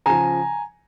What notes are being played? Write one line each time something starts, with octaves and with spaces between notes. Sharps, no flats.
C#3 F3 G#5 A#5